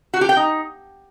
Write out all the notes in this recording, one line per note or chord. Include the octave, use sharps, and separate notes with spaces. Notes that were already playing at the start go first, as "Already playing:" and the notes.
F#4
G4
G5
D#4